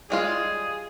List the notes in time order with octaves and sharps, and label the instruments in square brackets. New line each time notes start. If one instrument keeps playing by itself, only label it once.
[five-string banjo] G3 G#3 F4 [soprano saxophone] G#4